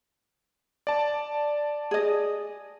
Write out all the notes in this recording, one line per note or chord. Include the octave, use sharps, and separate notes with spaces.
D5 A5
G#4 D#5